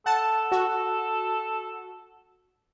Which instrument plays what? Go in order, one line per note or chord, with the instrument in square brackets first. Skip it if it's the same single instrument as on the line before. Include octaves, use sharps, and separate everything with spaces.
[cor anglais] A4 [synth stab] F#5 A5
[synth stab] F#4